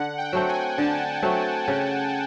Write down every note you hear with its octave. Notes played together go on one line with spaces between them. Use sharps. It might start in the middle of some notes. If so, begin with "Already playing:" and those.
Already playing: D3 F#5
G5
F#3 A3 C4
G#5
D3 A5
F#3 A3 C4
C#3